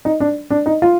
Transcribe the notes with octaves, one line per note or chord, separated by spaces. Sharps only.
D#4
D4
D4
D#4
F4